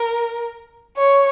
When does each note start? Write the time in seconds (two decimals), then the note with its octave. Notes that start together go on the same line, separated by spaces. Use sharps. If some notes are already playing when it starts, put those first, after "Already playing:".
Already playing: A#4
0.97 C#5